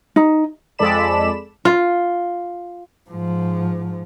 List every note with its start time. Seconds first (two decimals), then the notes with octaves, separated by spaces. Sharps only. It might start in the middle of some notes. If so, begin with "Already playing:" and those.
0.16 D#4
0.79 F2 G#3 A4 D5 B5 E7
1.65 F4
3.10 G#2 F3